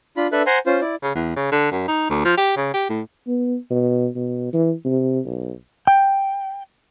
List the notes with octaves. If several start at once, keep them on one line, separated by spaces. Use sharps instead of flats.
D4 F4 B5
D4 A4 B4 E5 F#6
C5 F#5 G#5 A#5 C6
C#4 F4 C5
E4 D5
C#3
E2
C#3
D3
F#2
D#4
D2
F3
G4
C#3
G4
A2
B3
B2
B2
E3
C3
B1
G5